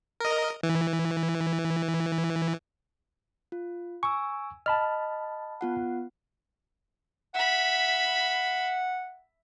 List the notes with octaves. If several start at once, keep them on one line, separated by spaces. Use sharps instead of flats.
A#4 D#5
E3
F4
G#5 C#6 E6
D#5 A5 B5 F6
B3 F4 F#5
E5 F#5 B5